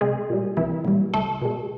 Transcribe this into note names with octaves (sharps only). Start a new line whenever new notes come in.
C2 G#3 G#4
A#2 G3
C2 E3 E4
A#2 G3
C#2 A3 A4
B2 G#3